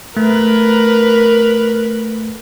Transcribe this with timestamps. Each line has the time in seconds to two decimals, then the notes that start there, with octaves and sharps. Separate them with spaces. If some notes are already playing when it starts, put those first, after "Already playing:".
0.17 A3 A#4 B4